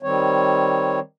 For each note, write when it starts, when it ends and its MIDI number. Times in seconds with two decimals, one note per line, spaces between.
0.03 0.99 51
0.03 0.99 55
0.03 0.99 60
0.03 0.99 73